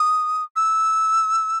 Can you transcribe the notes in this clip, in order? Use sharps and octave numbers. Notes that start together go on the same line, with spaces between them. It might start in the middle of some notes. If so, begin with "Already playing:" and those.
Already playing: D#6
E6